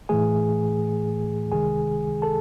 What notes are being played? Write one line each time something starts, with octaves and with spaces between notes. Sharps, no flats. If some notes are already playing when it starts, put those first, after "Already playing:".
A2 E3 A3 G#4 G#5
C#2 C3 D#3 G#3 G#4 G#5
A4 A5